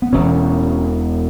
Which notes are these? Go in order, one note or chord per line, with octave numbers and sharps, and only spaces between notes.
B3
E1 E2 B2 C#4